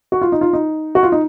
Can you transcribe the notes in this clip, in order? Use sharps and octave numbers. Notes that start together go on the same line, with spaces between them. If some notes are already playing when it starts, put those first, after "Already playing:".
F#4
F4
D#4
F4
D#4
F#4
F4
D#4